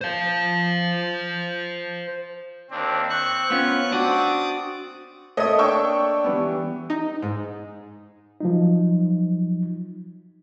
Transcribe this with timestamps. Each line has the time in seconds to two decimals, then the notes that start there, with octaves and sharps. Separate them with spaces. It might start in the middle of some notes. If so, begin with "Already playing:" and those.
0.01 C5 F5
2.71 D#2 C4 D4
3.10 C#6 F#6
3.50 B3 C#4 F4
3.91 C4 D4 F#4 D6 D#6 A6
5.37 A3 A#3 C#5 D#5 D#6
5.59 D4 G5 C#6 E6
6.24 E3 G3 B3
6.90 D#4
7.22 G#2
8.40 F3 F#3 D#4